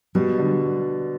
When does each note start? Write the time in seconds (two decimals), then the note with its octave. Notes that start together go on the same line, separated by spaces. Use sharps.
0.15 B2 G3
0.39 D3